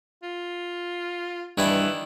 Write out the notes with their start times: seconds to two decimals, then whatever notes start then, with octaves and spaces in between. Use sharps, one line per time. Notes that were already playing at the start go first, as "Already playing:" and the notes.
0.23 F4
1.58 G2 D#3 E3 D4 E4